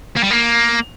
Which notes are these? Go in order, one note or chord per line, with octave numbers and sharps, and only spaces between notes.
A#3
G3
A#3